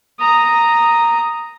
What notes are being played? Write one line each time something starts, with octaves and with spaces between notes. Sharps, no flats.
A#5 D#6